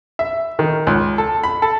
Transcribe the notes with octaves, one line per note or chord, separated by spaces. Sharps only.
E5
D#3
C#2
A4
B5
A4